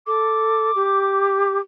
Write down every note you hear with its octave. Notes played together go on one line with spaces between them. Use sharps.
A4 D6
G4